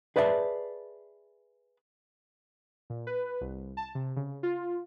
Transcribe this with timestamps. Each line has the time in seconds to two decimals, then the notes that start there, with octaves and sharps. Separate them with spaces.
0.16 G#4 B4 D5 E5 F#5 A5
2.90 A#2
3.07 B4
3.41 C2
3.77 A5
3.95 C3
4.16 C#3
4.43 F4